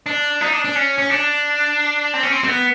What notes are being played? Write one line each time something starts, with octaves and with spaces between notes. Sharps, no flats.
D4
D#4
D4
D4
C#4
C#4
D4
C4
C#4
C4
C4
B3